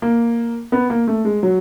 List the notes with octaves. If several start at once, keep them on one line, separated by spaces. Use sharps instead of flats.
A#3
B3
A#3
A3
G#3
F#3